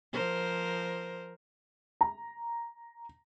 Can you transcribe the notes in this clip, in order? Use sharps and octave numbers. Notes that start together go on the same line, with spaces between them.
F3 A#4 C5
A#5